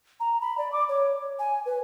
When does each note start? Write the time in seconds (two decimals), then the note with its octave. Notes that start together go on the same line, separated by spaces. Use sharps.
0.20 A#5
0.41 B5
0.58 D5
0.72 D6
0.89 C#5
1.39 G#5
1.66 B4